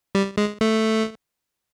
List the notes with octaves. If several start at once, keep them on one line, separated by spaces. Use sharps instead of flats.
G3
G#3
A3